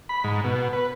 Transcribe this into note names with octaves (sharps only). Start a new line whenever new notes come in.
B5
G#2
B2
B4